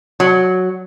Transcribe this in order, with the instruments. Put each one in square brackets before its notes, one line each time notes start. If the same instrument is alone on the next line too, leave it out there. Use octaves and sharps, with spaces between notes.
[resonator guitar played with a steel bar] F#3